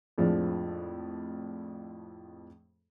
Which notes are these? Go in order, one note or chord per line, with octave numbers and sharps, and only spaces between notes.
F2 A2 F3 G#3 D4